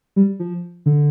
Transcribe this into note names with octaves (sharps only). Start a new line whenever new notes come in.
G3
F3
D3